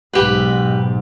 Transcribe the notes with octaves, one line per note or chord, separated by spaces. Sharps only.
B1 G#2 G4 B4